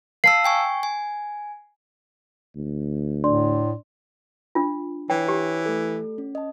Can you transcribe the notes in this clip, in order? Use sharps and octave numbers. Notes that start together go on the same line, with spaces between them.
F5 A5 E6 C7
G5 G#5 C#6
G#5
D2
A2 D4 D5 C6
D4 F4
E3 C#5 G5
G4
A3 A4
C#4
D#5 A5